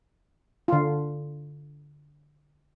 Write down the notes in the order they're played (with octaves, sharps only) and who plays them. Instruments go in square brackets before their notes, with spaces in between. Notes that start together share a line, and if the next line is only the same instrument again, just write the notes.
[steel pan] D3 F4